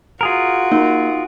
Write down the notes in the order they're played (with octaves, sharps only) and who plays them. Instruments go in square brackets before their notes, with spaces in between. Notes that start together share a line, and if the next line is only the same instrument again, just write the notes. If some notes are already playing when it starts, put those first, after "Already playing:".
[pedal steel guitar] F4 G#4 A#4 [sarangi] F#4
[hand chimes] A#3 [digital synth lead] D#4